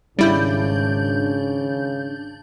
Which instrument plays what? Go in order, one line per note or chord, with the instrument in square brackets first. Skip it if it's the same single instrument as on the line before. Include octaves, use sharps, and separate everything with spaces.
[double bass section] G#1 [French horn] C#3 [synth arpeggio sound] G3 E4 [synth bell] D4 G6